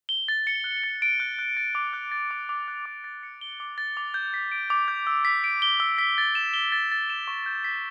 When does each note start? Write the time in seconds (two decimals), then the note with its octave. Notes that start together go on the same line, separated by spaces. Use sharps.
0.09 G7
0.28 A6
0.47 C#7
0.64 F#6
0.84 A6
1.02 D7
1.20 F#6
1.39 F#6
1.57 A6
1.75 D6
1.93 F#6
2.11 A6
2.31 D6
2.49 D6
2.68 F#6
2.85 D6
3.04 A6
3.23 C#7
3.41 G7
3.60 D6
3.78 A6
3.97 D6
4.14 G6
4.34 B6
4.52 D7
4.70 D6
4.88 G6
5.07 E6
5.25 B6
5.44 D7
5.62 G7
5.80 E6
5.98 B6
6.18 A6
6.35 E7
6.54 G7
6.72 A6
6.92 A6
7.10 E7
7.28 C#6
7.46 G6
7.64 B6